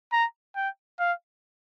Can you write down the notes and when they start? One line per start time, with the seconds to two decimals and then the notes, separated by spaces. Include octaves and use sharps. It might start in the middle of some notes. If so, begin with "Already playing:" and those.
0.12 A#5
0.56 G5
0.99 F5